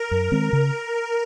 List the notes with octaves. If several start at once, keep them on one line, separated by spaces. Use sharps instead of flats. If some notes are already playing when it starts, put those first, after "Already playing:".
Already playing: A#4
F#2 A#4
D#3 G#3 C4
C#3